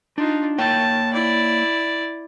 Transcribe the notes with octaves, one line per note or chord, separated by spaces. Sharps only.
D4 D#4 F4
A#3 C#5 G5 A5
E4 D5